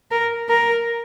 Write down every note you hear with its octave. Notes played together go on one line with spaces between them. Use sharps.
A#4
A#4